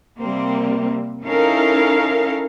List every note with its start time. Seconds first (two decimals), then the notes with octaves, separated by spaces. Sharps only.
0.20 C3 G3 A#3 C4
1.24 C#4 D#4 E4 A4 A#4 F5